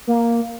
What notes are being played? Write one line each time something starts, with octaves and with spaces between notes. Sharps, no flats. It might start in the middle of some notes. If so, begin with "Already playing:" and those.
A#3